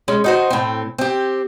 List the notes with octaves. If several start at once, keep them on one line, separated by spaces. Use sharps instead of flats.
G#3 C#4
D#4 F#4 C5
A2 C4
C4 G4